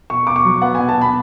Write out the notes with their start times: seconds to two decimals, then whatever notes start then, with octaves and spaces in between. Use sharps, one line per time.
0.10 B2 C#6
0.27 B2 D6
0.36 C#6
0.45 F#3
0.62 B3 F#5
0.75 B2 G#5
0.89 A5
0.97 B2 B5